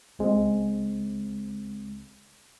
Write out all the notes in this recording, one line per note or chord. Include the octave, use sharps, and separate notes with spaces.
C#2 C#3 G#3 C4